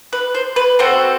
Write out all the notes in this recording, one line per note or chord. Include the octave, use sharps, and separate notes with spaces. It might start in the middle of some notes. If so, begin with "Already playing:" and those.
B4
C5
B4
C4 F#4 A4 C5